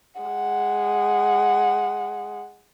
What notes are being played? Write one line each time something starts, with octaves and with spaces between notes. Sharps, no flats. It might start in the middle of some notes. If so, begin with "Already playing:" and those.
G#3 F#5